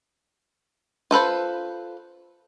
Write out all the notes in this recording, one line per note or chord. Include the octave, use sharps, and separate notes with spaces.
F4 A4 B4 C5